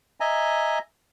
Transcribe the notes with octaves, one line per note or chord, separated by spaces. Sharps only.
D#5 E5 G#5 A#5